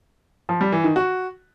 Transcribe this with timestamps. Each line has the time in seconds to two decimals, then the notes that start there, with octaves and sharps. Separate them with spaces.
0.49 F3
0.61 G3
0.72 E3
0.84 D#3
0.96 F#4